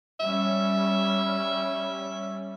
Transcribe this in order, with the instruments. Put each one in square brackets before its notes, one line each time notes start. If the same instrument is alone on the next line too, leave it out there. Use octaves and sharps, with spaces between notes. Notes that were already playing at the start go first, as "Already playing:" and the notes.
[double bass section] G3 C#4 [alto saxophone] E5